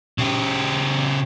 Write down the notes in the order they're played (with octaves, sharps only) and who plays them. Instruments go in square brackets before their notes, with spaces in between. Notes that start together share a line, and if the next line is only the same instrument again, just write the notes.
[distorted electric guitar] C#3 G4